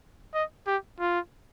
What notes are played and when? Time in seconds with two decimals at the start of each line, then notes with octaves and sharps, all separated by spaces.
0.34 D#5
0.67 G4
0.99 F4